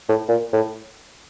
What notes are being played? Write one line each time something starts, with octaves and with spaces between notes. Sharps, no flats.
A2
A#2
A2